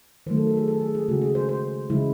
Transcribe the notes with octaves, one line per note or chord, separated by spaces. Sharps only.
D#3 F#3 A3 C5
A4
A4
G#4
A4
G#4
G#4
C#3 G#3 F#4
G#4
C5
C5
C#3 E3 G#3 E4